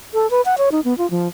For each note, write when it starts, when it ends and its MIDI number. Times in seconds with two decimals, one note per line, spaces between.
0.14 0.29 69
0.31 0.41 71
0.46 0.55 78
0.58 0.69 73
0.72 0.81 63
0.85 0.96 59
0.98 1.09 65
1.11 1.28 53